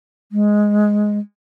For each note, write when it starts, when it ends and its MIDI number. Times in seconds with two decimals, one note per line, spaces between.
0.32 1.18 56